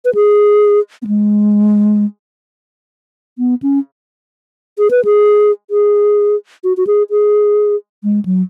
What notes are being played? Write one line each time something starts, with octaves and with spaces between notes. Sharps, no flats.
B4
G#4
B3
G#3
B3
C#4
G#4
B4
G#4
G#4
F#4
F#4
G#4
G#4
G#3
F#3